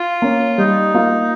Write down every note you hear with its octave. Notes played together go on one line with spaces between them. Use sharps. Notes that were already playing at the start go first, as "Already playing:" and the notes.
Already playing: F4
A#3 C#4
G3 D#4
A#3 F4